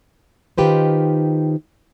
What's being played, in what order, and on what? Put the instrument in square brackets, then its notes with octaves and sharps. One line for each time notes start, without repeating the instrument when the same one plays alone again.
[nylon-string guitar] D#3 D#4 F4 G4 B4 C5